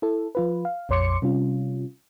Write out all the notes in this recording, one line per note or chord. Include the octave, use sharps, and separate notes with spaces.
E4 A4
F3 F4 B4
F5
A#1 F2 C#5 C6 D6 C#7
C3 G3 C#4 F4